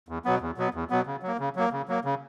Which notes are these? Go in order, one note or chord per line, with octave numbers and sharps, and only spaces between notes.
E2
B2 F#3 B3
E2
B2 F#3 B3
E2
B2 F#3 B3
C#3
F#3 A#3
C#3
F#3 A#3
C#3
F#3 A#3
C#3